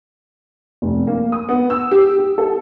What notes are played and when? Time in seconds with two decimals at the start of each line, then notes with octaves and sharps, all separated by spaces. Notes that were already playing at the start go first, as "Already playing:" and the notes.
0.82 F1
1.07 A#3
1.32 D#6
1.49 B3
1.70 E6
1.91 G4
2.18 G4
2.38 A4